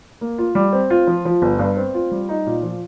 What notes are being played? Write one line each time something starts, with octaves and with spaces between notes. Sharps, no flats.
A#3
F4
G3
C4
F4
F3
F3
G1
G2
C4
F4
G3
D#4
A#2
F3